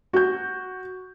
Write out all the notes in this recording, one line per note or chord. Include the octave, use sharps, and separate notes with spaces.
F#4 G6